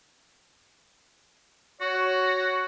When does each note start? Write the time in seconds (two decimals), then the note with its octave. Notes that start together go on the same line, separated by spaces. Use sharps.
1.81 F#4 C#5